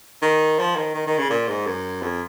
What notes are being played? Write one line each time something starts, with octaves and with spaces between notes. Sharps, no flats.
D#3
F3
D#3
D#3
D#3
C#3
A#2
G#2
F#2
F2